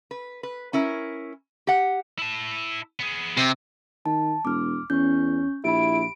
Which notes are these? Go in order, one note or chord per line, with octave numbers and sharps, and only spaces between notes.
B4
B4
C#4 E4 A#4
G4 F#5
E4 A5
B3 G#4
C3
D#3 A5
E1 D6 F6
E2 C#4 C#6 G6
A#1 E4 G4 B5 D7